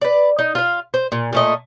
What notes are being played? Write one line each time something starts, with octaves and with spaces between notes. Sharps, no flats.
B4 D5
D#4
F4 F5
C5
A#2
A#2 A3 D#5